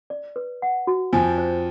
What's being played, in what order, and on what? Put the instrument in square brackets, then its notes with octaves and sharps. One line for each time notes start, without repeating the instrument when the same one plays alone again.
[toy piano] D5
B4
F#5
F#4
[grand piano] F2 F3 [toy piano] G#5
[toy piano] C5